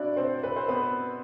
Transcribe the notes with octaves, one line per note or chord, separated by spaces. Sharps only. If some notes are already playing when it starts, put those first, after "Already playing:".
Already playing: D4 E4 F#4 D5
C4 C5
B4
C5
B3 B4